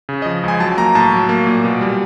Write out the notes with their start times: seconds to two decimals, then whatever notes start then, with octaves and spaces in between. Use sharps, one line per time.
0.09 C#3
0.22 D#5
0.26 F3
0.43 C#2 G#5
0.60 F#3 A5
0.77 A#3 A#5
0.95 A2 A5
1.12 F#3
1.29 A#3
1.47 A#2
1.64 B2
1.81 G3